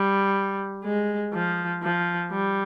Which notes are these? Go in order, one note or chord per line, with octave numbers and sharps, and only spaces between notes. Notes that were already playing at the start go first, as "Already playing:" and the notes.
Already playing: G3
G#3
F3
F3
G3